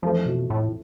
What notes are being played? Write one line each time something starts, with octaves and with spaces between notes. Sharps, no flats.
F2 E3 F3 A3 E4 A4
B2
A2